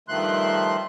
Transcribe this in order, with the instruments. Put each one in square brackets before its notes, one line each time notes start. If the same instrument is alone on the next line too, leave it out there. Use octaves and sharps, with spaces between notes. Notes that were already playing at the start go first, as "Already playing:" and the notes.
[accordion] G2 D#3 F3 A3 C6 F#6